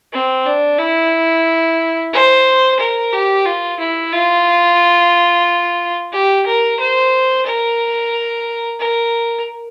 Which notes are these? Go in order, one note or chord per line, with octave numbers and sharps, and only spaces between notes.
C4
D4
E4
C5
A#4
G4
F4
E4
F4
G4
A#4
C5
A#4
A#4